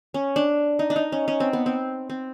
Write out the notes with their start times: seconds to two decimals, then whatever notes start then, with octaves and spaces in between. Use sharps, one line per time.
0.14 C#4
0.36 D4
0.79 D#4
0.90 D4
0.96 D#4
1.12 C#4
1.28 C#4
1.40 C4
1.53 B3
1.66 C4
2.10 C4